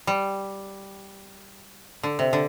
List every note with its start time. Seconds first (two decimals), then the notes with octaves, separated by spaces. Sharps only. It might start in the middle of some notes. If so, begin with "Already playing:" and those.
0.07 G3
2.03 D3
2.19 C3
2.33 D3